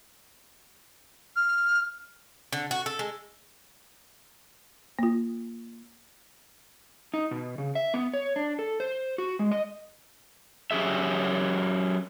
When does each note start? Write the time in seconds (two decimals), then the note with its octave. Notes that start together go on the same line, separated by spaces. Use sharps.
1.36 F6
2.53 D3
2.71 F#4
2.86 A4
2.99 G#3
4.99 A#3 F4
7.14 D#4
7.31 B2
7.58 C#3
7.75 E5
7.94 B3
8.14 C#5
8.36 D4
8.59 A4
8.80 C5
9.18 F#4
9.39 G#3
9.51 D#5
10.71 F#3 C#4 G4 G#4 E5